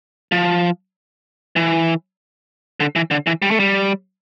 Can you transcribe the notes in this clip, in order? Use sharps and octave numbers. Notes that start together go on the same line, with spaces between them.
F3
E3
D3
E3
D3
E3
G3
A3
G3